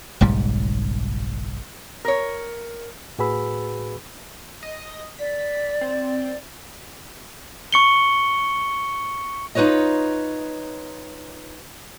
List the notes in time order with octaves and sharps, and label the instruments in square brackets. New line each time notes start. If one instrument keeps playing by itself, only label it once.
[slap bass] F#1 B1 G#2 G3
[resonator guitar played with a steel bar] A#4 C#5
[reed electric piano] A2 F#4 G#4 B4 B5 E6
[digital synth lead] D#5
[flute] D5 [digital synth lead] B6
[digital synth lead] C4
[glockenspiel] C#6 C#7 G7
[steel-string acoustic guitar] D#4 F4 B4 C#5 D#5